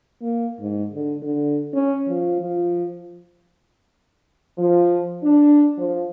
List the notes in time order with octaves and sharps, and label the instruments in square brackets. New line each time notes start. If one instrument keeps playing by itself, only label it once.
[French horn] A#3
G#2
D3
D3
C#4
F3
F3
[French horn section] F3
D4
F3